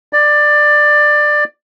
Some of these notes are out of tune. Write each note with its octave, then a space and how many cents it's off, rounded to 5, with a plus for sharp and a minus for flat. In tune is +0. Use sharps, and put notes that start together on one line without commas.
D5 +15